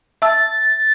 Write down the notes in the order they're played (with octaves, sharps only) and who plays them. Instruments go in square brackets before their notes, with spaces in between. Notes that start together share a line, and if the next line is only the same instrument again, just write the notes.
[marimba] E5 A5 E6 [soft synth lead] A6